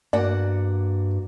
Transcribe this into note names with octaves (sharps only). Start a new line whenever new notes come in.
G2 A#3 F#4 D5 F#5